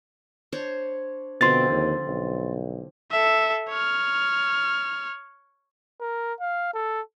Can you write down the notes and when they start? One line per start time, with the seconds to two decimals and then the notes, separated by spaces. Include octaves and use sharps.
0.52 D4 C5 C#5
1.41 B2 D3 F3 C4 C6 A6
1.71 D#2
2.07 B1
3.11 A4 E5
3.69 C#5 F6
6.01 A#4
6.40 F5
6.74 A4